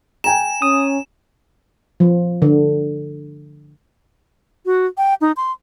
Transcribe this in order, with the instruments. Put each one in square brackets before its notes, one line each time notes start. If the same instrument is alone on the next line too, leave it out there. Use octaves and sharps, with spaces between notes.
[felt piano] G5 G#5 A#5 [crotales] E7
[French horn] C#4 [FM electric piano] D#6
[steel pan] F3
D3
[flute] F#4
G5
D#4
C6